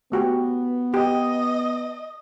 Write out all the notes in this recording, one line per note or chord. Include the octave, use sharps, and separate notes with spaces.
A3 B3 F#4 G4
G4 D#5